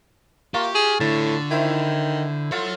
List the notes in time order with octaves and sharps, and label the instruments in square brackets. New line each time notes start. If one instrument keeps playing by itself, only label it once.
[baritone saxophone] A#3 [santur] F4 C#6 [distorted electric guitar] G4
[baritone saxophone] G#4
[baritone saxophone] A2 [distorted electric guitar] D3 [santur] A5
[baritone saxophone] D#3 [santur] E4 C5
[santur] F4 A4 C6 [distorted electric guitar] C#5 F#5